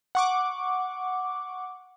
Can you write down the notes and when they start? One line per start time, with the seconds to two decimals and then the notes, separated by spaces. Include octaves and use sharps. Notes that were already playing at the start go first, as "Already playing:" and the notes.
0.15 F#5 C#6 D6